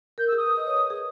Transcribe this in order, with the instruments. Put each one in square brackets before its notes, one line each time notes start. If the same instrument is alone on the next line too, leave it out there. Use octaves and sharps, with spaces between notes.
[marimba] A#4 [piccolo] G6
[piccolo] E6
[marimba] G#4
[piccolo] D#6
[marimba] B4
D#5
C#5
B4
G#4